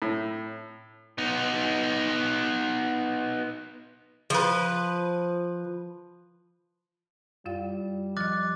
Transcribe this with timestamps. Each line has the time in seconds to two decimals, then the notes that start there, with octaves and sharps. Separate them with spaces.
0.02 A2
1.18 B3 D#4
4.30 F3 B4
7.45 F#2 G3 F4 F5
8.17 F3 D#5 D6 F#6 A6